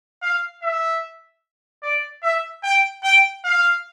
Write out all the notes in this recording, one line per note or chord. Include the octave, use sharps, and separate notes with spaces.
F5
E5
D5
E5
G5
G5
F5